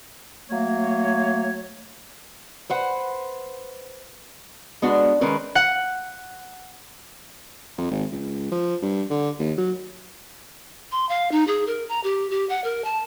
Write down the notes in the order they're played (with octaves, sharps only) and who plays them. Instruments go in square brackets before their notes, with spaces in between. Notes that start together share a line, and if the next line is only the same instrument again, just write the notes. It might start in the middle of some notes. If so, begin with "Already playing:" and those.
[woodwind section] F#3 A3 A#3 C#5
[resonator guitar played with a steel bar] B4 C5 F#5
G#3 B3 D4 F#4
D#3 G#3 C#4 A#4 B4
[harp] F#5
[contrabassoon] F2
G#1
C#2
F3
G2
D3
D#2
F#3
[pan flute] C6
F5
D#4
G#4
A#4
A#5
G4
G4
F#5
A#4
A5